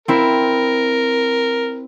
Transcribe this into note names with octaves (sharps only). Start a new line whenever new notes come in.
C4 E4 A#4